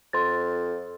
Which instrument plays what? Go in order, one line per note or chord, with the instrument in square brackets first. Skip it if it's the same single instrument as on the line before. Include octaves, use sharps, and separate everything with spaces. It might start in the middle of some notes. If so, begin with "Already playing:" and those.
[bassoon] F2 [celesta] C6 A6